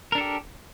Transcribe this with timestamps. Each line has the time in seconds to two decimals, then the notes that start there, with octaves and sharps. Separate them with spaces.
0.12 A#4
0.15 D4
0.18 A4
0.21 G4